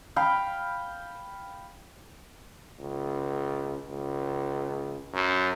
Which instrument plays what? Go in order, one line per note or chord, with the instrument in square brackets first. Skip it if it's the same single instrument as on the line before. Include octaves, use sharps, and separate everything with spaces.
[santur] F5 G5 B5
[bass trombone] C#2
C#2
F#2